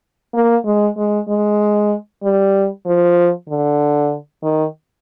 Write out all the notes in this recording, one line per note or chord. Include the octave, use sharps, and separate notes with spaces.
A#3
G#3
G#3
G#3
G3
F3
D3
D#3